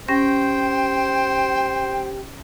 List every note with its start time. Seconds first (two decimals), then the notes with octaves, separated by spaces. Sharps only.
0.08 C#4 G4 C5 G5 A#6